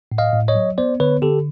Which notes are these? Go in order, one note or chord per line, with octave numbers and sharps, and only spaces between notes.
A2
D#5 F5
A2
C#5 D#5
F#3
B3 C5 D5
D3 B4 C#5
D3 G4 A4